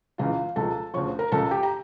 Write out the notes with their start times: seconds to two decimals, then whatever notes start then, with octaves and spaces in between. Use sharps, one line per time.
0.18 C#2 C#3 E3 F4 F5
0.56 C#2 C#3 F3 A4 A5
0.94 D2 C#3 F3 C#5 C#6
1.19 A#4 A#5
1.32 C#2 C#3 F3 A4 A5
1.51 G4 G5
1.63 A#5